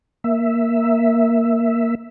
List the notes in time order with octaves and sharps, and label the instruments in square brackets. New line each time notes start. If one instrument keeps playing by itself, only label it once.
[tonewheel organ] A#3 E5